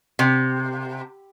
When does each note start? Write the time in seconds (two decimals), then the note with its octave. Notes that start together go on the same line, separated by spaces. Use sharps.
0.19 C3